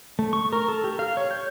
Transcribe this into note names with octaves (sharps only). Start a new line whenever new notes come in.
A3
C#6
A#4
A4
G4
F5
C#5
G6